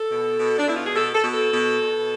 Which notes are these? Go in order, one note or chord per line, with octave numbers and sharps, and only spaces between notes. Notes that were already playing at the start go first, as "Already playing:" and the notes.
Already playing: A4
B2
B2
D4
B2 E4
F4
G#4
B2 A4
A4
B2
A4
B2
B2